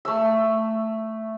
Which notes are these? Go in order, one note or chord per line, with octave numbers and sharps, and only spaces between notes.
A3 E6